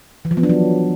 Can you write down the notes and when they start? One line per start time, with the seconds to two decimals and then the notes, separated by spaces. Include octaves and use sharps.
0.25 E3
0.31 F3
0.37 B3
0.43 D4
0.49 F#3